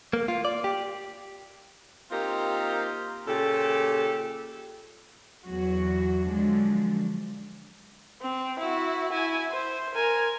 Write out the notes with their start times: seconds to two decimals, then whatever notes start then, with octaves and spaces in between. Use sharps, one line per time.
0.13 A#3
0.28 F4
0.45 D5
0.64 G4
2.11 A#3 C4 D#4 F4 G4 A#4
3.27 A#2 C#3 G4 A4
5.44 E2 F#3 F#4
6.27 D3 F3 F#3 G#3 D4
8.21 C4
8.59 E4 F#4
9.12 E4 G#5
9.51 C5
9.94 A#4 G#5